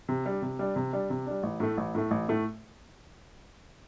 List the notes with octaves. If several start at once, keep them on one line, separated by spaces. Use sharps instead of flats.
C3
G3 D4
C3
G3 D4
C3
G3 D4
C3
G3 D4
A1
A2 A3
A1
A2 A3
A1
A2 A3